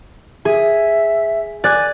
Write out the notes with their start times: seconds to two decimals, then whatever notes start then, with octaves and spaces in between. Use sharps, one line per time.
0.45 G#4 E5
1.64 D5 G#5 F#6 G#6